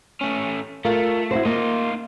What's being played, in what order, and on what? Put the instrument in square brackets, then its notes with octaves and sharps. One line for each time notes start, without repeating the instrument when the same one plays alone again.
[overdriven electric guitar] A3 C#4
[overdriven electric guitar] A3 [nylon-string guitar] F4 A#4
[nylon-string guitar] E4 F#4 C5
[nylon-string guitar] A#3 [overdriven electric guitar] D#4 F4